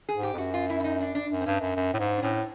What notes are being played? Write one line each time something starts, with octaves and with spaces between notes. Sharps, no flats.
G#4
G#2
G4
F2
F#2 F#4
F4
E4
E4
D#4
D4
D4
F#2
C4
G2 C#4
F#2
F#2
A2
G#2
D4
A2 C#4